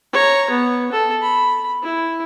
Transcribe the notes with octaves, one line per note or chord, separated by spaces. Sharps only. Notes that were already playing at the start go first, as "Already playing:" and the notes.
C#5 A#5
B3
A4
B5
E4